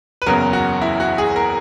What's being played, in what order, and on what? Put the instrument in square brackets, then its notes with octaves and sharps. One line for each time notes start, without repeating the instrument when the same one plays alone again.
[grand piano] B4
F#1 E2 C#3 F#3 A#4
F#4
E4
F#4
G#4
A#4